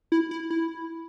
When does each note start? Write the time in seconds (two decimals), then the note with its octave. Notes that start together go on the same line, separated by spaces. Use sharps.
0.12 E4
0.31 E4
0.50 E4